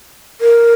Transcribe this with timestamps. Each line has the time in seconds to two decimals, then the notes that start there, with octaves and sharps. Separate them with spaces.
0.41 A#4